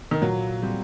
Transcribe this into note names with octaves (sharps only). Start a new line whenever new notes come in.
D#3
A#2 F#3
G3 C4